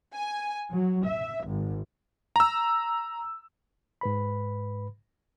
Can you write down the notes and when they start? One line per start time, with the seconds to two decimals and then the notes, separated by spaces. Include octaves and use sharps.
0.15 G#5
0.70 F#3
1.07 E5
1.47 G#1
2.36 A#5 E6
4.01 G#2 B4 B5